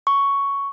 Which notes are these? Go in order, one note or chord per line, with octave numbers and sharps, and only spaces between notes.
C#6